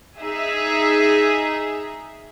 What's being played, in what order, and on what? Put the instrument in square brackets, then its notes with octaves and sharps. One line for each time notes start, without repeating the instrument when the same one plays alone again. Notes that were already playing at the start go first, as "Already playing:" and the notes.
[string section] D#4 G#4 E5